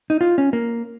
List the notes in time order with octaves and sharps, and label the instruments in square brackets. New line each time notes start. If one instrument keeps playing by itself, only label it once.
[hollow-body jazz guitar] D#4
F4
C#4
A#3